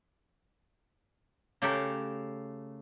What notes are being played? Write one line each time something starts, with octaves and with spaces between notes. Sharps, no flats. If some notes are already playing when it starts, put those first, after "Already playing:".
C#3 A3 G4 A4 A#4